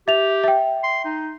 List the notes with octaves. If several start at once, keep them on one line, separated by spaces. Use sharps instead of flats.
G4 E5 F7
E5 G5
C6
D#4